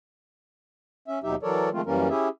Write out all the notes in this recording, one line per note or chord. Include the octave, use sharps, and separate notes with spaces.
C#4 E5
D#2 B2 F#3 D#4 G4 E5
E3 F#3 A4 A#4 C#5 D5
D#3 F3 G#3 A3 C4 F4
F#2 E3 G3 A#3 C#4 A#4
C#4 E4 G4 G#4 E5